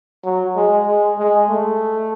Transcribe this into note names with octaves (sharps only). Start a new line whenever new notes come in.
F#3
G#3
G#3
G#3
A3